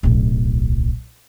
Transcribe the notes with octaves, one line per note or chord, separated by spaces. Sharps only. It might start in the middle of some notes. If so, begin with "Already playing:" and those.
D1 B1